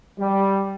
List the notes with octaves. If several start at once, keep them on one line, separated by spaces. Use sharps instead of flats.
G3